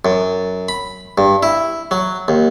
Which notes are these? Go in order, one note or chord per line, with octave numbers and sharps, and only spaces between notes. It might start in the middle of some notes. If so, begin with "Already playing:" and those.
F#2
B5
G2
E4
F#3
D#2